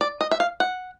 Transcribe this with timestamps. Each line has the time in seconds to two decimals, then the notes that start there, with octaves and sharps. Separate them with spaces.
0.01 D5
0.21 D#5
0.31 E5
0.40 F5
0.60 F#5